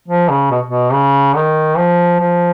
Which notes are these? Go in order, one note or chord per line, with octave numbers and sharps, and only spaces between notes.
F3
C#3
B2
B2
C#3
D#3
F3
F3